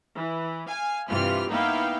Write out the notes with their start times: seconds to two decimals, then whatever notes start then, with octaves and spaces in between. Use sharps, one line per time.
0.15 E3
0.68 F5 G#5
1.09 G2 C3 E3 F4 G4 F6
1.51 A#3 B3 D#4 E4 F5 G5